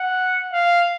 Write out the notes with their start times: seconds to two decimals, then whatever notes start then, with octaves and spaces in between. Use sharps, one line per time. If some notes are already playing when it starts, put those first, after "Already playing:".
Already playing: F#5
0.52 F5